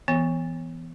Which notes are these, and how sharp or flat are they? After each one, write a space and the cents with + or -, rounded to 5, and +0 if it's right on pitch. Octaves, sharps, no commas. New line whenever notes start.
E3 +15 B3 +0